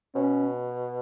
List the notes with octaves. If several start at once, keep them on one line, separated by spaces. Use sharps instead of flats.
B2 C#4